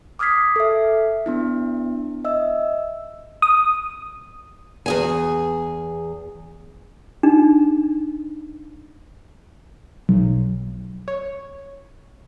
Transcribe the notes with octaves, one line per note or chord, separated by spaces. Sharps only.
D6 D#6 F6 G#6 B6 C7
A4 E5
B3 D4 E4
D#5 E5 E6
D#6
E2 G#4 G#5
D4 D#4
B1
C#5